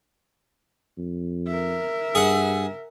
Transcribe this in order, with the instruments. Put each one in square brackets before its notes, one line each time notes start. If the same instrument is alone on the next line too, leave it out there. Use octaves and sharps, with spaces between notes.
[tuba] F2
[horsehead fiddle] A#4 E5
[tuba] G2 [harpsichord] G#4 F#5